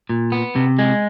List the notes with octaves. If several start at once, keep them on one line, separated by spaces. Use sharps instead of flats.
A#2
B3
C3
G#3